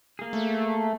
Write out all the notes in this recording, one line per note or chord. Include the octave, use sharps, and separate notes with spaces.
A#3 G#4
A3